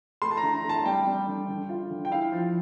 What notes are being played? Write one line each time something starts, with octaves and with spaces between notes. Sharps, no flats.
A3 C6
A5
A#5
D3
A#5
A3 A5
A5
G3 G5
G3
D3
D3
F4
D3
G5
E4 F5
F3